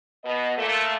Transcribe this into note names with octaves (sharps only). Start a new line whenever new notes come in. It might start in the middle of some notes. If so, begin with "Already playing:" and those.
B2 B3 D#5
A#2 A3